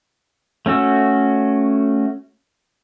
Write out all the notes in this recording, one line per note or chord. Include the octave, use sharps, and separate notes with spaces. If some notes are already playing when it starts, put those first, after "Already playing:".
A3 C#4 F#4 E6